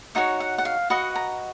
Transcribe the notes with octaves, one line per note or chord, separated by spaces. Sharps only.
D#4 F#4 C#5 F#5
F#5
F#5
F5
F#4 B4 D#5 F#5
A#5